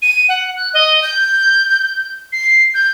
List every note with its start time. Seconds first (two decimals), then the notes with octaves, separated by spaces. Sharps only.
0.02 D#7
0.29 F#5
0.56 F#6
0.74 D#5
1.02 G6
2.32 C7
2.74 G6